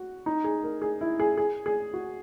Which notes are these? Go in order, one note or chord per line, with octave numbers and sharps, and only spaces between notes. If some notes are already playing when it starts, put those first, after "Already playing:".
Already playing: F#4
D#4
G#4
A#4
G#4
E4
G#4
G#4
G#4
F#4